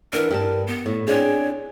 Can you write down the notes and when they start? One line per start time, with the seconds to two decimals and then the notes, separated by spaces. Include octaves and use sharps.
0.13 E3 B3 D4 A#4
0.30 G2 G3 A5
0.67 B3
0.86 A2
1.08 C4 D4 G#4 C#5